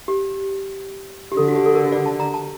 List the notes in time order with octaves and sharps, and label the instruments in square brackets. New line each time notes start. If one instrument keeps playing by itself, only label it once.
[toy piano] G4
G4
[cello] D3 [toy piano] A4
[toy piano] F#4
G4
A4
A#4
D5
A5
A#5
A5